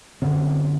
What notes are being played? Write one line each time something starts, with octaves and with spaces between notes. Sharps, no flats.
F#2 D3 C4